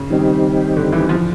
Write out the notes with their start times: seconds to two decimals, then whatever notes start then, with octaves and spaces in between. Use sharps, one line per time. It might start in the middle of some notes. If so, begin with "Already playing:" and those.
Already playing: C#3
0.10 D#3 G3 C4 D#4 G4
0.77 D3
0.93 E3
1.09 F3